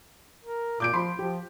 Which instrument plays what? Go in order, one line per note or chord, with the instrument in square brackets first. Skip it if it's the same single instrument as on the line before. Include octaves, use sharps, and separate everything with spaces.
[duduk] A#4
[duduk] A#2 [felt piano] D6 G6 D7
[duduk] F3 [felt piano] B5 C6
[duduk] F3 [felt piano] G4